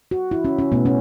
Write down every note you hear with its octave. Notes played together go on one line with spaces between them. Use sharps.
F#4
E4
C#4
C#4
B2 A3 B3
C#4